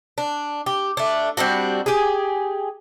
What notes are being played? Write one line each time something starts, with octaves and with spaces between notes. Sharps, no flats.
D4
G4
A3 D4
G3 C4 D4 F#4
G4 G#4